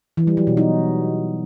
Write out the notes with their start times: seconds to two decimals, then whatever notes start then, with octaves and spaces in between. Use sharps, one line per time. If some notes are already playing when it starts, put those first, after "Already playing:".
0.17 E3
0.27 G3
0.37 F#3
0.47 B2
0.57 D#4